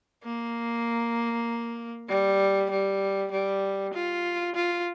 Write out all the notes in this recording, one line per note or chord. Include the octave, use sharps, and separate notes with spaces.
A#3
G3
G3
G3
F4
F4